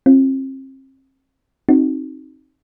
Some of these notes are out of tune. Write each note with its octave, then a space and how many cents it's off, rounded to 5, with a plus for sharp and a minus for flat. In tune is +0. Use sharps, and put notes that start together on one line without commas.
C4 +35 F4 -5
C4 +30 D#4 +0 F#4 +0